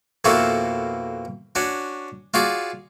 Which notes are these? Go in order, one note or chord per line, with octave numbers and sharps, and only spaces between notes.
F2 B2 A#3 E4 F#4 A4
C#4 D4 F#4
F4 F#4 G#4 D5